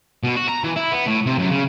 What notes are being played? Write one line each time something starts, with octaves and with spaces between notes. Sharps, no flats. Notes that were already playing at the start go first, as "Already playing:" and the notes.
B2
F#4
A#5
E3
E4
B3
A2
C3
F#2
C#3